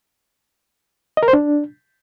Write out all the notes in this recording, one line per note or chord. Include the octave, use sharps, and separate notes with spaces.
D#5
A#4
C5
D4